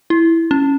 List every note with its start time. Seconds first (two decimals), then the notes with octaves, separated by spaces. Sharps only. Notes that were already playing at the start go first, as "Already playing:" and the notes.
0.10 E4
0.51 C#4